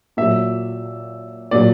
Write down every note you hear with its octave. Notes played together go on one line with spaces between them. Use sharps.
A#2 F#3 E5
A#2 F#3 D5